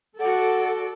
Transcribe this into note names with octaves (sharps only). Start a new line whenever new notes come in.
F#4 A4 D5 F#5